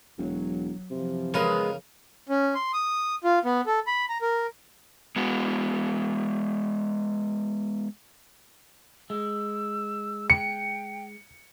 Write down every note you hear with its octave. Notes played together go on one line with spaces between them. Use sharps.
E1 F#3
F#2 C3 E3 F3
C#3 G#3 B3 A#4 B4
C#4
C6
D#6
F4
B3
A4
B5
A#5
A#4
G#3 B3 F#4
G#3 E6
G5 C#7